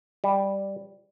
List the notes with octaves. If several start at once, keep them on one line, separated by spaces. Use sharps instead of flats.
G3